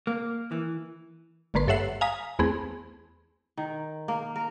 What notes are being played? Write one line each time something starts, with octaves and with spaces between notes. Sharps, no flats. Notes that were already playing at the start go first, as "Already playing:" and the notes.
A#3
E3
G#1 D3 A#3 B4 C6
G2 A4 C#5 E5 F#5 C7
F5 G#5 A#5 D#6 B6
E2 A3 B3 C4 G#4
D#3
A#3
A#4